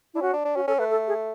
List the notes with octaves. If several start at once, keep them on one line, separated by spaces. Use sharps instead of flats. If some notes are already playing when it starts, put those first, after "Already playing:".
D4 E4
C#4 F#4
D4
D4
C#4 F#4
C#4 A4
A3 B4
A4
G#4